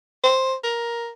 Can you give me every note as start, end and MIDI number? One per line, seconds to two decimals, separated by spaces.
0.24 0.55 72
0.64 1.10 70